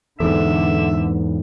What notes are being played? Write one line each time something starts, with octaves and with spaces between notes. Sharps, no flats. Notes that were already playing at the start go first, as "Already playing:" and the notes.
E2 G#2 D3 A4 E5